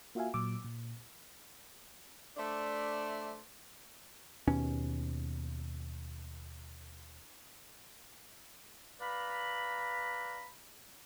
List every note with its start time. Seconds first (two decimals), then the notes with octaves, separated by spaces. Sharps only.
0.15 A#3 F4 F#4 E5 F5 G#5
0.34 A#2 F#3 D6 E6
0.64 A#2
2.37 A3 D4 C5 D5 E5
4.48 D#2 B2 C#4
9.00 B4 D5 F5 A#5 B5